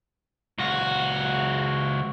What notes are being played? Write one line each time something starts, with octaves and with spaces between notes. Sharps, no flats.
C#2 F#4